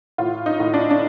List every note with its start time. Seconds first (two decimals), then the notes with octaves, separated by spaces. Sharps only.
0.18 A2 F4
0.46 D#4
0.60 A2
0.74 D4
0.90 D4